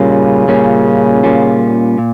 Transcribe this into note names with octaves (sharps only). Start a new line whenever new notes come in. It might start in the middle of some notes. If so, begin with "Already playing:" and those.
Already playing: A#2 C#3 G3 A#3 C#4 F4
A#2 G3 A#3 C#4 F4
A#2 G3 A#3 C#4 F4
A#2